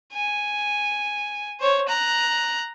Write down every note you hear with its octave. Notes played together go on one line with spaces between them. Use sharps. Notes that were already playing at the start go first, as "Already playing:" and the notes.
G#5
C5 C#5
A#5 F#6